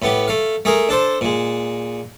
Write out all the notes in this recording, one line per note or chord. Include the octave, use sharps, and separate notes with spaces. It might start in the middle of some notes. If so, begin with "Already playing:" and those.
A2 B3 G4
A3 F5
A3 G#4 A#4
D4 A4 C5
A#2 G#3